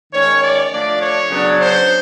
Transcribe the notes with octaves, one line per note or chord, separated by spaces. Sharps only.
D#3 G#3 C#4 C#5
D5
F3 A3 D4 D5
C#5
C#3 F#3 B3 D4
C5